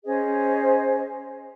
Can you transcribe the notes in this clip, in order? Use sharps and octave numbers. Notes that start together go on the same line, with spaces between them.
C#4 G#4 C5 D#5